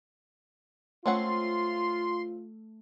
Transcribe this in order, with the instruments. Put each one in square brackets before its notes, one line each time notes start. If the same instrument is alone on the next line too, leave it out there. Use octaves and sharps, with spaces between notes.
[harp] A3 [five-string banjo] C4 C#4 F#5 [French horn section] F4 [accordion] C6